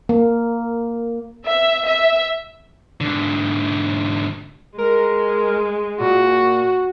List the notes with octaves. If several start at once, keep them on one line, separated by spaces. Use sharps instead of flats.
A#3
E5
E5
G#2 D3
G#3 A#4
A#2 F#4